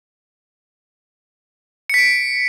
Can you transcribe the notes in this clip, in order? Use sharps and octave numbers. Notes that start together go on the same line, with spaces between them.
B6 C#7 D7